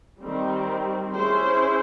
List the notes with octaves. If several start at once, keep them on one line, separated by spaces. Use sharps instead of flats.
D#3 G3 C4
C#4 E4 G#4 C5